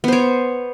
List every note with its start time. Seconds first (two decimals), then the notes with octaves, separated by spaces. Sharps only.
0.04 B3
0.08 C5
0.13 C#5